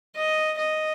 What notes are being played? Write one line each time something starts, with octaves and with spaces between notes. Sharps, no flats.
D#5
D#5